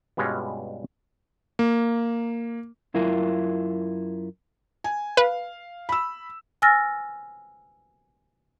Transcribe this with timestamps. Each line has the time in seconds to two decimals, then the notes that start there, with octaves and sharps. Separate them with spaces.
0.17 G2 B2 G3 G#3 C#4 F4
1.59 A#3
2.94 F#2 E4 F4 A#4
4.84 G#5
5.17 B4 F5
5.89 B5 E6
6.62 G#5 E6 F6 A6 A#6